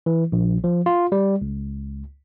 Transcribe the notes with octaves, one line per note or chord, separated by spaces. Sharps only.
E3
A#1
F3
F4
G3
C#2